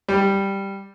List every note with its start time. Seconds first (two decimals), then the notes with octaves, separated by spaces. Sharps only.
0.08 G3